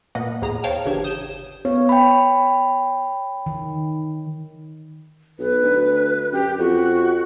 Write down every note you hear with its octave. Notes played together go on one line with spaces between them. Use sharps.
A#2 A#3 B4 D#5 F#5
D#2 A2 B3 G#4 A#5
C5 C#5 F5 G5 A5 F6
G1 C#3 E3 D4 G4 G#6
D#6 G6 E7
B3 C#5
G5 B5
D#3
B1 B4
D2
F#2 G4
F2 F#4